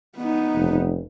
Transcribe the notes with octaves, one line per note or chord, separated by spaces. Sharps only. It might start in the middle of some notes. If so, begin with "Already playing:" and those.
B3 D#4
F1